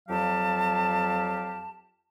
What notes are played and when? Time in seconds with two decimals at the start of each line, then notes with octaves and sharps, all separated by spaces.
0.08 F2 F#3 G4 F5 A5